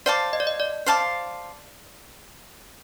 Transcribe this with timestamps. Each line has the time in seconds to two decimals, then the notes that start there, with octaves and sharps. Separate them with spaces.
0.06 C5 D5 F5 A5 D6
0.33 D#5
0.40 D5
0.47 D#5
0.60 D5
0.86 C5 F5 A5 D6